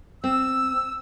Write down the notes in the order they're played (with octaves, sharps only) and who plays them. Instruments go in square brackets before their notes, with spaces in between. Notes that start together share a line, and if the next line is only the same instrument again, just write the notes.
[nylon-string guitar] C4 [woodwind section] E6